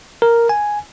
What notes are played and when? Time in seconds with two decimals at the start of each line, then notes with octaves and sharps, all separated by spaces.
0.22 A#4
0.49 G#5